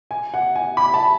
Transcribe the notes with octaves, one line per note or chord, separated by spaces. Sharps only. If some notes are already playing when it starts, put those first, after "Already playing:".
G#5
F#5
G#5
B5
A5